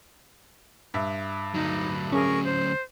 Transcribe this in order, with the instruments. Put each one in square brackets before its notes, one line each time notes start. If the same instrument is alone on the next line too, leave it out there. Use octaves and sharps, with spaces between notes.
[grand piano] G2 E5
[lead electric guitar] D2 F#3 [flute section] D#4
[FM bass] C#4 [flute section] G#4 A#4 C#6
[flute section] C5